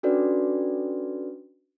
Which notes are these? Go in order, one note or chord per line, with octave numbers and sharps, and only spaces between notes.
C#4 D4 F#4 A4 B4 D5